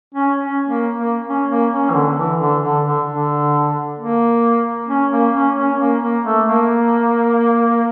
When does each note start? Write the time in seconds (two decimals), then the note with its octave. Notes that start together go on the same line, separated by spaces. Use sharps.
0.14 C#4
0.37 C#4
0.67 A#3
0.96 A#3
1.27 C#4
1.50 A#3
1.72 C#4
1.90 E3
1.94 D3
2.17 E3
2.40 D3
2.63 D3
2.85 D3
3.07 D3
3.99 A#3
4.88 C#4
5.11 A#3
5.34 C#4
5.57 C#4
5.80 A#3
6.02 A#3
6.24 A3
6.46 A#3